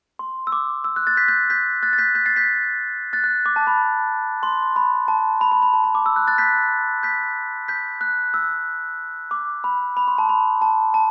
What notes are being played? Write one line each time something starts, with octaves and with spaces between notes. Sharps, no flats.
C6
E6
D6
E6
F#6
F#6 A6
G6 B6
G6 B6
G6 B6
F#6 A6
A6
G6 B6
G6 B6
A6 C7
G6 B6
F#6 A6
F#6
D6
A5
B5
C6
B5
A5
B5
B5
B5
A5
B5
D6
E6
F#6
F#6 A6
G6 B6
G6 B6
G6 B6
F#6
E6
D6
B5
B5
C6
A5
B5
A5
A5